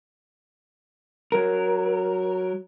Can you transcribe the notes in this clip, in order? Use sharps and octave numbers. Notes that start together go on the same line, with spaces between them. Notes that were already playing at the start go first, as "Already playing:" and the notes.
F#3 A#4